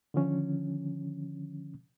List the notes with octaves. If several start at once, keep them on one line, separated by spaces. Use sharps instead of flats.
D3 D#3 F3 C#4